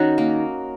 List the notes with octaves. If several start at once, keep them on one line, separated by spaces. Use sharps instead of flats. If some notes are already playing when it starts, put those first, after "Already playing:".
Already playing: D#3 C#4 D#4 F#4
A#3